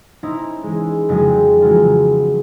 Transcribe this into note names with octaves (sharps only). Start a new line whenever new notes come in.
C#4 D#4 E4 C5
E3 G#3
F2 C#3 F3 F#3 G#3
E3 F#3 G#3 D#4 F4 F#4